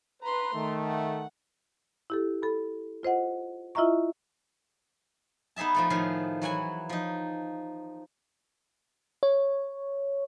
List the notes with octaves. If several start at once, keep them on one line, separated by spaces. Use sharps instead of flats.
B4 A#5 C6
D#3 A3
F#5
E4 G4 A4
A4 B5
F4 C5 D#5 F#5
E4 F4 D#5 E5 A#5 C#6
B3 D#4 G#4 E5 A5
F3 A3 A4
A2 D#3 F3 G#4 F5
E3 F#3 F#5 G#5
F3 D#4
C#5